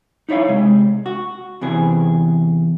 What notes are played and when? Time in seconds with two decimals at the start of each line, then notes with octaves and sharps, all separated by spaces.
0.29 D#4 E4 C#5 D5 F5
0.48 C3 G#3
1.06 F#4
1.61 E2 C3 E3 G#4